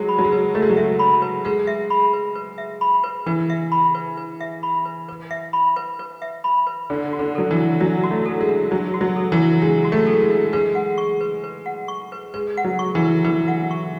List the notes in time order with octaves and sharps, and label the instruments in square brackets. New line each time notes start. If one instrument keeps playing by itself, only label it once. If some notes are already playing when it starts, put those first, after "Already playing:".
Already playing: [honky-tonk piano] F#3 G#3
[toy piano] B5
[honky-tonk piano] F#3
G#3
[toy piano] B4
[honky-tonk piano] A3 [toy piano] B4
[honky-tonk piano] G#3
F#3
[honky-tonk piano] G#3 [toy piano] E5
[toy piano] B5
B4
[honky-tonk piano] G#3 [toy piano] B4
[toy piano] E5
B5
B4
B4
E5
B5
B4
[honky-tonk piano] E3 [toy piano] B4
[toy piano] E5
B5
B4
B4
E5
B5
B4
B4
E5
B5
B4
B4
E5
B5
B4
[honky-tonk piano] D3 [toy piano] D4
[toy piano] F#4
[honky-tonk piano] D3
[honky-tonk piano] F#3 [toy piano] A4
[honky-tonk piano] E3
[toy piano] D4
[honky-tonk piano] F#3 [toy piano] D4
[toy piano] F#4
[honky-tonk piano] A3
[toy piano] A4
[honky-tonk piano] G#3
[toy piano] D4
[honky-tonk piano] F#3 [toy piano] D4
[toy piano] F#4
[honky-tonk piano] F#3
[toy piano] A4
[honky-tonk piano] E3
[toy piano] D4
[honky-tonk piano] G#3 [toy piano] D4
[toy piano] F#4
[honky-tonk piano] A3
[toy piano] A4
[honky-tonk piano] G#3
[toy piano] D4
[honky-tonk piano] G#3 [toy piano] B4
[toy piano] F#5
C#6
B4
B4
F#5
C#6
B4
[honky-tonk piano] G#3 [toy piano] B4
[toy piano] F#5
[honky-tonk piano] F#3
[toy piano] C#6
[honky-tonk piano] E3
[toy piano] B4
[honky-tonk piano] E3 [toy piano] B4
[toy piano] F#5
C#6